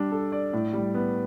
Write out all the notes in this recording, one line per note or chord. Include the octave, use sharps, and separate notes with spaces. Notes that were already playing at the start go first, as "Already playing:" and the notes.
Already playing: G3 D4
A4
D5
A2
G3
B3